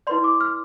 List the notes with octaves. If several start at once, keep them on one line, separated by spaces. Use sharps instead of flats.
E4 B4 D5 C6
D6
F6